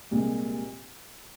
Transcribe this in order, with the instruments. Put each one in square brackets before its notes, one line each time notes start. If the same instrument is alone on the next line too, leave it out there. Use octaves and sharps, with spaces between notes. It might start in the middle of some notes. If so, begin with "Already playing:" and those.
[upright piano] C2 A#2 G#3